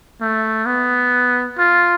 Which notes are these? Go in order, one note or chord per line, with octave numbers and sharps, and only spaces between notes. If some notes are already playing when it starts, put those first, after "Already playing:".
A3
B3
F4